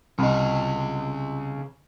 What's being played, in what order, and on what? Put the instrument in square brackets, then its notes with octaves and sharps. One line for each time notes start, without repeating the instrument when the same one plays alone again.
[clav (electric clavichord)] C2 [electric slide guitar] C#3 D#5